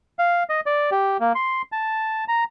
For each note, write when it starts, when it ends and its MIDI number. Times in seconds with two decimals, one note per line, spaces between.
0.19 0.43 77
0.50 0.61 75
0.66 0.90 74
0.91 1.17 67
1.20 1.33 58
1.35 1.62 84
1.72 2.24 81
2.28 2.44 82